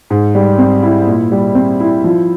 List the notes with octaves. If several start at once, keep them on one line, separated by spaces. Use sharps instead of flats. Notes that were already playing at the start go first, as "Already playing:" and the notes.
G#2
G3
C4
E4
A#2
G3
C4
E4
F3